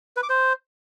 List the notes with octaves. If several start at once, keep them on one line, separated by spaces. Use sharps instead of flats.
B4
D6
C5